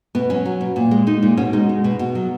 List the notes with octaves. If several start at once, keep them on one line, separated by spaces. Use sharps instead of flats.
B2 B3
F#3 C#4
F#3
B2
A#2
G#3
G#3 D#4
A#2
B2 C#4
G#3 D#4
G#3
B2
B2
F#3